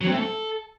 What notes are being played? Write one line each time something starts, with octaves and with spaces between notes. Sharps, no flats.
F#3
C4
A3
A4